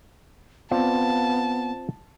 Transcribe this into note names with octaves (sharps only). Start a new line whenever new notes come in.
B3 C4 F4 D5 A5